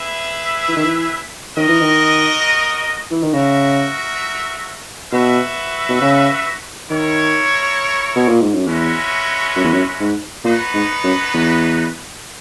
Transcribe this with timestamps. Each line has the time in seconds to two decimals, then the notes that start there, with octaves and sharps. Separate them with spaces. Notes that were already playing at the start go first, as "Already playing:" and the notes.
Already playing: E4 G#4 B4 E5
0.68 E3
0.76 D#3
0.84 E3
1.57 D#3 F#4 A#4 D#5
1.68 E3
1.81 D#3
3.11 E3
3.23 D#3
3.34 C#3 F#4 A#4 E5
5.12 B2 F#4 B4 E5
5.89 B2
6.01 C#3
6.89 D#3 E4 A#4 C#5
8.16 B2
8.28 A#2
8.41 G#2
8.54 F#2
8.67 E2 G#3 C#4 F#4 B4 E5
9.56 F#2
9.64 E2
9.73 F#2
10.00 G#2
10.44 A#2 B3 D#4 F#4 B4 D#5
10.74 G#2
11.04 F#2
11.34 E2